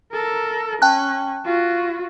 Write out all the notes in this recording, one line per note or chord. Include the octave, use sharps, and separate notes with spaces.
A4 A#4
C#4 G5 A5 F#6
F4 F#4